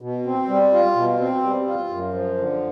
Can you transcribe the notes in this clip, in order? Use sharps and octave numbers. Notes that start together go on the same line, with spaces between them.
B2
C4
G3
F4
B2
C4
G3
F4
F#2
F3
D3